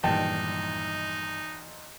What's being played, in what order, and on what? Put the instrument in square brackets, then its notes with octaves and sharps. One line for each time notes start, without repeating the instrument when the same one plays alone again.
[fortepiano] B1 E2 A5 [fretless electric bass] G2 A#2 D#3 [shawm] D#4 [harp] G5